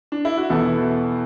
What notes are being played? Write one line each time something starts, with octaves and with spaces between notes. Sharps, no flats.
D4
E4
F#4
E2 B2 B3 E4 A4